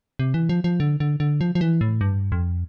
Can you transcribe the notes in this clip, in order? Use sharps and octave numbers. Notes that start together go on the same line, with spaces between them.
C3
E3
F3
F3
D3
D3
D3
F3
F3
E3
A2
G2
F2